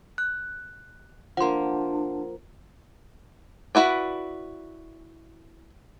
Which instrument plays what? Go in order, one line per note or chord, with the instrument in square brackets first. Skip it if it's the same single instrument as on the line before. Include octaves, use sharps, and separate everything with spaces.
[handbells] F#6
[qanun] F3 A#3 [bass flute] D4 [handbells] F#5 C6
[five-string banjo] E4 F#4 B4 D5